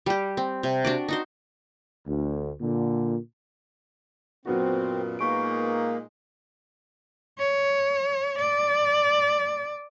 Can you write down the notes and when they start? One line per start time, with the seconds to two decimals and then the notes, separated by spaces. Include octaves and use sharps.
0.06 G3 G4
0.37 C4
0.63 C3
0.85 D4 F#4 D5
1.08 D#4 F#4 C5
2.06 D2
2.61 A#2 D3
4.45 F#2 A#2 F#3 B3 C4 F#4
5.19 A#2 G#3 A#3 D#4 B4 C#6 D7
7.38 C#5
8.38 D5